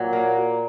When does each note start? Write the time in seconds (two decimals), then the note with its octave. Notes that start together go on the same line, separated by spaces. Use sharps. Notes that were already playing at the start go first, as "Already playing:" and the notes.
Already playing: A#2 F#3
0.13 A#3